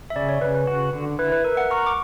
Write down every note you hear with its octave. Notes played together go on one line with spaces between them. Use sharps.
E5
C#3 D5
C#5
C#3 B4
B4
F#4
D3
E4 B4
B4
A#4 E5
F#5
A#4 C#6
D6